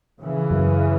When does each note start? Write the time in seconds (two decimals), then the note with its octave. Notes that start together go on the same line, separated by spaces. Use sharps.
0.21 C#3 E3
0.51 F#2